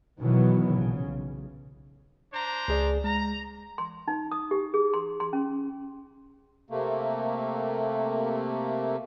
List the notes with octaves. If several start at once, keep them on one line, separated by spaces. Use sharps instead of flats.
B2 D#3 E3 F#3 B3
A#1 C#3
B1
D4 C5 A#5
C#2 G#4 D5
G#3 A#5
C6
D#4
D#6
G4
G#4
C6
C6
C#4
C3 A3 A#3